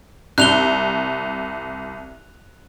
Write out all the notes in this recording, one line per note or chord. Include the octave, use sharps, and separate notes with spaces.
C2 F#6 F7 G7